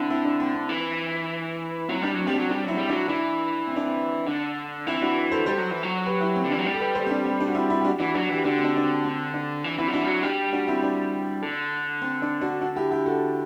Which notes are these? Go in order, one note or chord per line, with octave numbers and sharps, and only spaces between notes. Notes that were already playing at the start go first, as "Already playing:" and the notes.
Already playing: D3 C4 E4
C4 E4
D4
C4
C4
E3
F#3 C4 E4
G3 D4
F#3 C4
G3 C4
D4
F#3
G3 D4
F#3 C4 E4
G3
F#3 D4
E3 D4
C4
D4
C4
D3 D4
E3 C4 E4
D4 F#4
A4 C5
G3 A4 C5
F#3
E3
F#3
G4 B4
E4 G4
C4
D3
E3 D4
F#3
G3 D4
A4
G4 B4
A4 C5
C4
D4
C4
D4
F#4
C4 E4
C4 E4
G4
D4 F#4
E3 D4 F#4
F#3 D4 F#4
E3 G4
D3 D4 F#4
C4
D4
D4
C4
C4
D4
E3
E3 C4 E4
F#3
E3 D4 F#4
G3
F#3
G3 D4
D4 F#4
C4 E4
D4
D3
C4
D4
D4 F#4
D4 F#4
E4 G4
E4 G4
F#4 A4